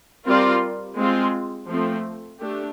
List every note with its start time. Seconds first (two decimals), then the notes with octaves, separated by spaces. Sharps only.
0.25 G3 C4 F4 A#4 D5
0.97 G#3 C4 F4
1.69 F3 A3 C4
2.41 A3 D4 G4